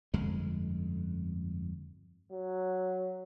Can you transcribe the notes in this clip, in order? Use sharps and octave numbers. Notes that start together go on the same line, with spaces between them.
G1 F2 G#3
F#3